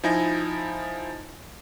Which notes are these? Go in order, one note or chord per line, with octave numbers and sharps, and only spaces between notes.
F3 D#4 E4 G#5 A#6